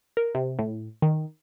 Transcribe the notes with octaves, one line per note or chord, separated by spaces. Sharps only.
A#4
C3
A2
D#3